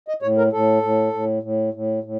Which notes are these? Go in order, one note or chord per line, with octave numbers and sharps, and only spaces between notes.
D#5
A2 C#5
A#4
A2 A4
A2
A2
A2
A2
A2